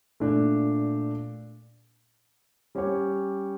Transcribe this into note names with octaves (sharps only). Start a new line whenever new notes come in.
A#2 A3 D4
G3 C#4 G4 C#5